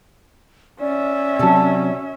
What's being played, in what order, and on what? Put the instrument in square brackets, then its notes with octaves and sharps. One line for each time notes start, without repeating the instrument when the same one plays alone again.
[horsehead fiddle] C#4 E5 [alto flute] D5
[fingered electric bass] C3 F#3 [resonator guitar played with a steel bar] A4 A5